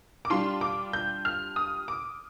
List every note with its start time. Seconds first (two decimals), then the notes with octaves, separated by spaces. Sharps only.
0.25 D6
0.30 G3 D4 F4 C6
0.61 D6
0.93 G6
1.25 F6
1.56 D#6
1.88 D6